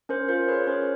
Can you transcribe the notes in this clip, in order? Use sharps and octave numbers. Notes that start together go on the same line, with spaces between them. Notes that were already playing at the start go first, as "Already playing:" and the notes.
C#4 A#4 C5
F4 A#4 C5
G#4 B4 C#5
C#5
C#4 A#4 C5